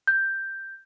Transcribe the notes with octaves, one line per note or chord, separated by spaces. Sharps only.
G6